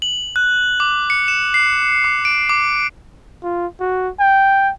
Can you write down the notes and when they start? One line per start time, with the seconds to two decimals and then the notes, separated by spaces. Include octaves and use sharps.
0.02 F#7
0.36 F#6
0.80 D6
1.10 C#7
1.28 E7
1.54 C7
2.04 D6
2.25 D7
2.49 D6
3.44 F4
3.80 F#4
4.20 G5